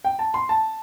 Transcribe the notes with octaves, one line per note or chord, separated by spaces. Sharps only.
G5
A5
C6
A5